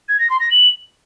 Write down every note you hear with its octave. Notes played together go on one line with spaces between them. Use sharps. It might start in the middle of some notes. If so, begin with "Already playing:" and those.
G#6
A#6
C6
A#6
F#7